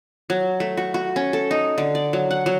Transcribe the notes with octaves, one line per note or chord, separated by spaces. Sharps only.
F#3
A3
F#4
F#4
C#4
A4
D#4
D3
D5
F#3
F#5
F#3